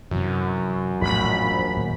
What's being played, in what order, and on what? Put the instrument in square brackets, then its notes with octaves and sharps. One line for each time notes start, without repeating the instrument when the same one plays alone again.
[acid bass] F#2 [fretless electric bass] C3 E3
[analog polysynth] A#1 B5 [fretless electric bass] E2 A2
[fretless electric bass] D#2 A#2